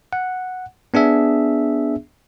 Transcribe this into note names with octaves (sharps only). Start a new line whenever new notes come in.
F#5
B3 D4 G#4 E5